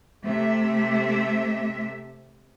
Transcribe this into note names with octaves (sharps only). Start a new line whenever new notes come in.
C3 A3 E5